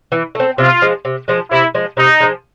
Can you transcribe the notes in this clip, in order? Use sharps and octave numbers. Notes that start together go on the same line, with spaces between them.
E3
A3 C4
C3 F4
F3 G#3
C3
F3 G#3
C3 E4
F3 G#3
C3 D#4
F3 G#3